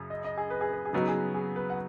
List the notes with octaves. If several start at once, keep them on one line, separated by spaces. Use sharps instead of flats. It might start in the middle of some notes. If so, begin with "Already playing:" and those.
Already playing: F#2 C#3
D#5
D#5
G#4
B4
G#4
B4
G#4
C#3 F#3 B3 D#4 F#4 B4
G#4
G#4
B4
F#5